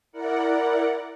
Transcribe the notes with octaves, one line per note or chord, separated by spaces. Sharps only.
E4 A#4 D5 F#5